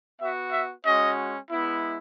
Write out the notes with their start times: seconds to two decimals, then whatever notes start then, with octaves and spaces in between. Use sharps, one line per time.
0.21 B3 F#4 E5
0.52 E5
0.85 G#3 C#4 F#4 D#5
1.50 G#3 B3 E4